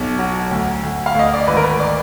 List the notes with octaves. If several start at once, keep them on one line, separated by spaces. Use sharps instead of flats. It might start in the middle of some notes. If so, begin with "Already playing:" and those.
Already playing: B1
F#3
D2
D2
F5
D2 D#5
D5
G#1 B4
A#4
B4
D5